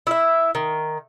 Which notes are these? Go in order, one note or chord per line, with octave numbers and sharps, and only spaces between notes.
E4 E5
D#3